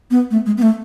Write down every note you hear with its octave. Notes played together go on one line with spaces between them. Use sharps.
B3
A3
G#3
B3
A3